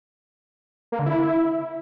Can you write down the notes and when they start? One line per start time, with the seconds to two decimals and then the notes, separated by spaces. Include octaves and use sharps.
0.92 A#3
0.99 D3
1.06 E4